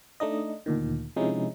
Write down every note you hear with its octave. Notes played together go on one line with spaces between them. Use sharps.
A3 D4 D#4 D#5
D2 A#2 D#3
C3 F3 G#3 C#4 D#4 E4